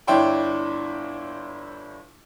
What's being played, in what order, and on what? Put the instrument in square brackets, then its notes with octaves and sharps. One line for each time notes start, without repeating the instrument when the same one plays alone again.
[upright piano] G1 D4 E4 C#5 G5 C6